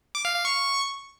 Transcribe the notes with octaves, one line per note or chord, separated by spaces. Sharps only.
D6
F5
F5
C#6